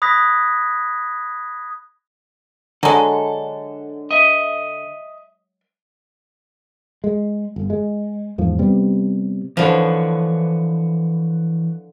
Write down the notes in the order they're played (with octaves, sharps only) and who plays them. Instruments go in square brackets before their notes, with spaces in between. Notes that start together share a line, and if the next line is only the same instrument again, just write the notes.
[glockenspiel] B5 D#6 F#6 G#6 A#6 B6
[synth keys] D3 [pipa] F#3 G#3 [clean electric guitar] A4
[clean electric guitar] D#5 E5
[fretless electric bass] G#3
G1
G#3
E2 G#2 F3
C3 G3 B3
[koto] D3 F3 [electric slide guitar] E3 B4 C#5